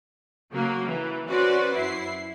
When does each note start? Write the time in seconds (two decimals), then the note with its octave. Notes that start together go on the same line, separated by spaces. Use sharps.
0.51 C#3 F#3 A#3
0.86 E3
1.29 C#4 F#4 B4 C5 D5
1.74 F#2 E4 C7